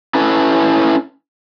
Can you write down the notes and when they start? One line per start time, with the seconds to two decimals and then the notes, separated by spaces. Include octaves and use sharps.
0.15 C#4 E4 A4 B4